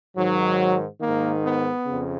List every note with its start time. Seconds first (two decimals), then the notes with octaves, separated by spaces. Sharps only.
0.16 G#2 D#3 F#3
1.01 G#2 D#3 A#3
1.44 B3
1.86 F2 C#3